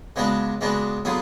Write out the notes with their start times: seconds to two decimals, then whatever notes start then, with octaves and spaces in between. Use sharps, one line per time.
0.16 C#3 G#3 B3 D4 F#4
0.61 C#3 G#3 B3 D4 F#4
1.05 D3 F#3 B3 F4 G#4